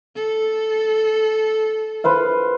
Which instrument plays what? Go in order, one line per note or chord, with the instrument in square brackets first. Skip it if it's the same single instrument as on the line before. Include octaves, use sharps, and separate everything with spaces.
[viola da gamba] A4
[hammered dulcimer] B4 C5 F5